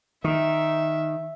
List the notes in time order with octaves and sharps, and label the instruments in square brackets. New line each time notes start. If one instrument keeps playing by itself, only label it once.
[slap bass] D#3 [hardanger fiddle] E5